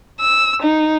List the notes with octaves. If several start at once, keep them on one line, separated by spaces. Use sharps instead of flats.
E6
D#4